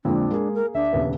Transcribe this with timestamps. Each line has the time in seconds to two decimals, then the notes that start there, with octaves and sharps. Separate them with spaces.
0.05 F2 A#2 D3 G#3 A#3 C4 D4
0.31 G#3 A#3 G#4
0.54 A#4
0.75 D2 D4 E5
0.93 D#1 C#3 B3